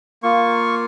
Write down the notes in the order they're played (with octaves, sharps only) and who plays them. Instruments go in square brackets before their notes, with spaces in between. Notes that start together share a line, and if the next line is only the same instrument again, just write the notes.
[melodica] A#3 F4 C#6